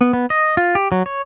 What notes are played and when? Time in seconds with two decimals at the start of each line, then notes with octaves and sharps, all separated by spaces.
0.01 B3
0.13 B3
0.30 D#5
0.57 F4
0.75 G4
0.92 F#3
1.06 C#5